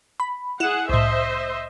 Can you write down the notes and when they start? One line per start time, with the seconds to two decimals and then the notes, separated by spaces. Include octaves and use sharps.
0.20 B5
0.60 E4 G#4 F#5 E7
0.89 C2 A2 C5 D#5 E5